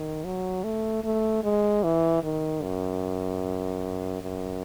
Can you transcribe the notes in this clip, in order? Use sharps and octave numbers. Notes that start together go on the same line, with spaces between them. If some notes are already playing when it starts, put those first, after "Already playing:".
Already playing: D#3
F#3
A3
A3
G#3
E3
D#3
F#2
F#2